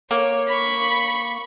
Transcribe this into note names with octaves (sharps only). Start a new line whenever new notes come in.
A#3 C#5
B5 C#6